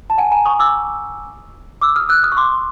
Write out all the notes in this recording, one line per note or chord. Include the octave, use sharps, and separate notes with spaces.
A5
F#5 G#5
G#5 A#5
C#6 D#6
D6 E6
D6 E6
D#6 F6
E6 F#6
D#6 F6
C#6
C6 D6